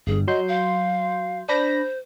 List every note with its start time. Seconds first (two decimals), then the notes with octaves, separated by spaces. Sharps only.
0.07 G1 G2 G#4
0.28 F#3 D#5 C6 G6
0.48 F5
1.49 D4 C5 B5 A#6